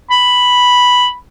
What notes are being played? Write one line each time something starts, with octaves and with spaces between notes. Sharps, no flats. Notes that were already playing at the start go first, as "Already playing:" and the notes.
B5